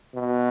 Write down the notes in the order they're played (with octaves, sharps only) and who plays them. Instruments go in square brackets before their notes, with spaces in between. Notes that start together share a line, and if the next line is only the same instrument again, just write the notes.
[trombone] B2